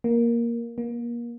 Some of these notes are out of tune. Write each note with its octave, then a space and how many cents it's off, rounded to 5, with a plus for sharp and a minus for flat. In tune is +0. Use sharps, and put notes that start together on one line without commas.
A#3 +10
A#3 +30